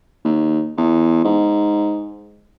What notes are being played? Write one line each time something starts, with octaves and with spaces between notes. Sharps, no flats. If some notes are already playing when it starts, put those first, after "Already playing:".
D#2
E2
G#2